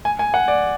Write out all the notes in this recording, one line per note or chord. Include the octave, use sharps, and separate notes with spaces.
G#5
G#5
F#5
D5